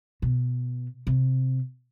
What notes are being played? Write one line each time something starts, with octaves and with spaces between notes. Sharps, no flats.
B2
C3